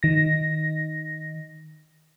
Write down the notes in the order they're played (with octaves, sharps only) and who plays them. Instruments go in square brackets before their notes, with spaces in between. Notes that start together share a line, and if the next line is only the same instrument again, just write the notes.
[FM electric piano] D#3 A#6